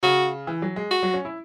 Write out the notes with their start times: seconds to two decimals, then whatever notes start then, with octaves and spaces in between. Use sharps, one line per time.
0.03 C#3 F#4
0.47 E3
0.62 F#3
0.76 G#3
0.91 F#4
1.03 F#3
1.14 C#4
1.25 E4